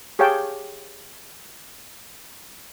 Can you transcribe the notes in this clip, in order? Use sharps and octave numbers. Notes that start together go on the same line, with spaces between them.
G4 G#4 C#5 F5 G5 A5